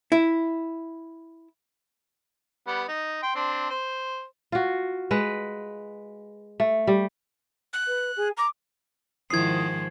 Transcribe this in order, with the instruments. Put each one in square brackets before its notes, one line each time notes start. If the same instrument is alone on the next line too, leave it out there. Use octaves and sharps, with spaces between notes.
[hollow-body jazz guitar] E4
[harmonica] G3 B3 F#5
D#4
G5 C6
C4 D4
C5
[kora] F4 F#4
G#3 B4
A3
G3
[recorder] F#6
[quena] B4
G#4
[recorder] A#5 [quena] D6
[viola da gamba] G#2 D#3 F3 [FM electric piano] E4 D#6 [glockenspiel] G#6 C7